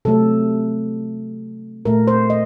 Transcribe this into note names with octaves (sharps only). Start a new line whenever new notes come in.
C3 F#3 A3 A4
A#2 A3 A#4
C5
D#5